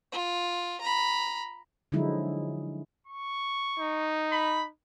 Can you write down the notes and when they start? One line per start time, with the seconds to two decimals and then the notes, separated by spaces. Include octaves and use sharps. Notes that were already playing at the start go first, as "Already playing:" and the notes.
0.12 F4
0.81 A#5 B5
1.92 D3 F3 F#3 G#3 D#4 E4
3.07 C#6
3.79 D#4
4.32 B5